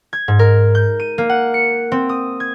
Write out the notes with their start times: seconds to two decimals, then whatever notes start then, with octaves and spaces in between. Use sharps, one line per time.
0.13 G#6
0.28 G#2
0.39 A#4
0.75 G6
1.00 D#7
1.18 A#3
1.29 F#5
1.54 C#7
1.92 C4
2.09 D#6
2.40 G#6